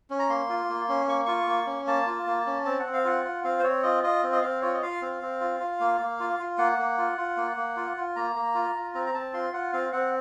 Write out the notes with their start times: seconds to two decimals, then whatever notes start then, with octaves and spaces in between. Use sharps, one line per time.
0.10 C#4
0.19 A#5
0.29 A#3 C6
0.49 F4
0.69 A#3
0.89 C#4
1.08 A#3 C#6
1.26 F4 C#6
1.47 A#3
1.67 C#4
1.87 A#3 A5
2.07 F4
2.27 A#3
2.47 C#4
2.65 C4 A5
2.80 F#5
2.86 C4
2.93 F5
3.05 F4 F#5
3.25 F4
3.44 C4 F5
3.59 C5
3.63 C4 C#5
3.83 F4 D#5
4.03 F4 D#5
4.23 C4
4.32 D#5
4.42 C4 F5
4.62 F4 C#5
4.74 D#5
4.82 F4 F5
5.02 C4
5.21 C4
5.40 F4
5.60 F4
5.80 A#3
6.00 A#3
6.20 F4
6.39 F4
6.58 A#3 F#5
6.78 A#3
6.98 F4
7.18 F4
7.37 A#3
7.57 A#3
7.77 F4
7.97 F4
8.16 A#3 A#5
8.36 A#3
8.55 F4
8.75 F4
8.94 C4 A#5
9.06 A#5
9.14 C4 A5
9.34 F4 C6
9.53 F4 F#5
9.73 C4 F5
9.93 C4 F#5